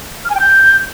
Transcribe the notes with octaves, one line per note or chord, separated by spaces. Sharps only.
F6
G#5
G5
G6